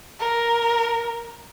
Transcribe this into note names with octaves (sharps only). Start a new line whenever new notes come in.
A#4